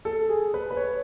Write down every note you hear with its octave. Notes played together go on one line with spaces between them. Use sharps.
A4
G#4
B4
B4
C#5